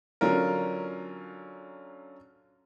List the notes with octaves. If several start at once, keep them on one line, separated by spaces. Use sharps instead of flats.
D3 F#3 C#4 F4 A#4